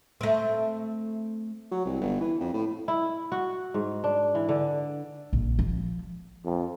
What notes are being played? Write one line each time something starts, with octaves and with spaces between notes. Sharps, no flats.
A3 C4
F#3
C2
G1
E3
F2
A2
E4
F#4
G#2
D4
E3
D3
A#1
F3
F2